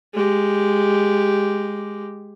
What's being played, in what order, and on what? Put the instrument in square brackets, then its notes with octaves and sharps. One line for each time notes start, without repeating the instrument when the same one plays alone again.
[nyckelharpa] G#3 G4